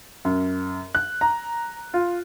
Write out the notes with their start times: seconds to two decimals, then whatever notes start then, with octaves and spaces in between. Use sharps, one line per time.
0.25 F#2
0.95 F#6
1.21 A#5
1.94 F4